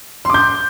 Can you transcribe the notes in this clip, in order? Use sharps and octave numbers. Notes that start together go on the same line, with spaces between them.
C6 D6 G6